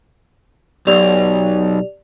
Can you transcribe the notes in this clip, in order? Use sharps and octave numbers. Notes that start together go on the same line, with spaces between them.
B1 G4 D5 F7